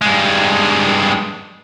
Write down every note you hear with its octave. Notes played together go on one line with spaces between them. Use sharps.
G2 G#3